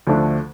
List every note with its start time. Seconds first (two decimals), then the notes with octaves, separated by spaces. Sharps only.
0.07 D2 D3 F3 A3 D4